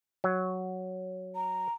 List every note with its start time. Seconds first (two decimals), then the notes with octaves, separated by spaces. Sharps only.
0.24 F#3
1.35 A#5